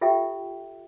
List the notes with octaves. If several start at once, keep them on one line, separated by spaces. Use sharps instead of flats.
F4 G4 A4 E5 G5